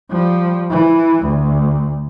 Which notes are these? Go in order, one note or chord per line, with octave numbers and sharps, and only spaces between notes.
F3 G3
E3
D2